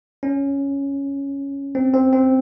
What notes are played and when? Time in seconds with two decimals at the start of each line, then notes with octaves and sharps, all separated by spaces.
0.23 C#4
1.75 C4
1.94 C4
2.13 C4